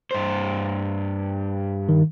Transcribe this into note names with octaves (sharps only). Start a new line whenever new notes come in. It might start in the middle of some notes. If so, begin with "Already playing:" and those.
G2 C5
D#3